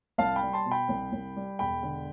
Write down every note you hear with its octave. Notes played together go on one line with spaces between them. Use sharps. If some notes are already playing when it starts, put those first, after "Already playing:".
C2 F5 A5
G5 B5
G3
A5 C6
B2
G5 B5
C2
C2
G3
E1 G5 B5
D3